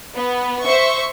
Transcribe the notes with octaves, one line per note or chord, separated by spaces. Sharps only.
B3
C5 E5 C#6